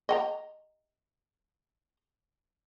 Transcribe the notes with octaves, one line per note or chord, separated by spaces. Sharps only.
D#5 G5 A#5